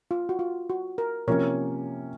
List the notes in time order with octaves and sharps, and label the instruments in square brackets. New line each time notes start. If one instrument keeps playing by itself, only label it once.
[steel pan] F4
F#4
F4
F#4
A#4
[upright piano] C3 F3 A#3 C#4 [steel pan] A#4 C#5